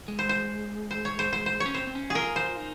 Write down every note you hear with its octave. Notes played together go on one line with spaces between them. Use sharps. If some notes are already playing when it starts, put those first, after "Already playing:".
G#3
C5
C5
C5
C#5
C5
C5
C5
C#5
C#4
C4 C5
C4
C#4
G#4
F4 A#4
C5
D#4